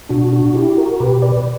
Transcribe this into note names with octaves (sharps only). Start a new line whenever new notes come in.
B2 D4 F#4
D4 F#4
E4 G4
F#4 A#4
B2 G4 B4
B4 D5